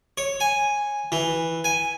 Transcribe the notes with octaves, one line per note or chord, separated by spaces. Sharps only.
C#5
G#5
E3
G#5